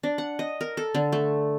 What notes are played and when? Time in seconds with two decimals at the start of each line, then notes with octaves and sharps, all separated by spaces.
0.03 D4
0.18 F#5
0.39 D#5
0.61 A#4
0.77 A4
0.95 D3
1.12 A3